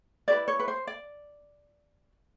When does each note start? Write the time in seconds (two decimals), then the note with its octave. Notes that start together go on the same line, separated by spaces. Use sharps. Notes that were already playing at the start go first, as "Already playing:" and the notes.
0.28 E4 G4 B4 D5
0.48 C#5
0.60 B4
0.68 C5
0.87 D5